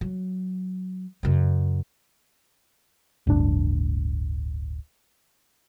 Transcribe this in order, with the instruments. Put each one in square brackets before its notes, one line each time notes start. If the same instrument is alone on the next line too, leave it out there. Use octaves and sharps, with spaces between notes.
[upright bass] F#3
F#2 C#3
[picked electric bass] D1 G1 D4